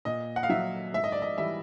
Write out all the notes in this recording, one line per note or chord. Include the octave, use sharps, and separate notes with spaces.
A#2 D#5
F#5
F5
F#3 E5
G#2 E5
D#5
D5
D#5
E3 G3 E5